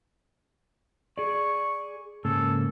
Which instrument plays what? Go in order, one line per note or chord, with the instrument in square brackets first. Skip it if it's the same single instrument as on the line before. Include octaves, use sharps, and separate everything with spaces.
[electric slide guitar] G#4 D5 [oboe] C#6
[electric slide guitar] G#2 C#3 A#3 [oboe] A4